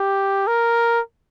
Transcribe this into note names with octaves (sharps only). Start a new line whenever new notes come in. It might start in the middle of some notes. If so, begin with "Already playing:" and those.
Already playing: G4
A#4